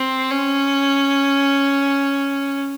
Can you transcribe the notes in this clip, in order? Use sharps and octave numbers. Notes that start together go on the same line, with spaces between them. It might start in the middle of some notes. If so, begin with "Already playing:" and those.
Already playing: C4
C#4